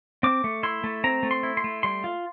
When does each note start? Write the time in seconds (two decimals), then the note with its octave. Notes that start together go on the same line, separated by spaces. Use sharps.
0.23 C4 D6
0.44 A3
0.63 E4 C6
0.84 A3
1.04 C4 A#5
1.23 A3
1.31 C6
1.43 E4
1.57 C6
1.64 A3
1.83 G3 C6
2.04 F4